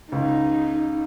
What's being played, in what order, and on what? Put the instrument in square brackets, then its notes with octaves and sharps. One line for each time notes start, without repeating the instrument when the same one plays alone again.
[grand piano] C#2 [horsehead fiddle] D#4